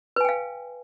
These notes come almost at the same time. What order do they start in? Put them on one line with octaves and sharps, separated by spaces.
B4 G#5 G5 F5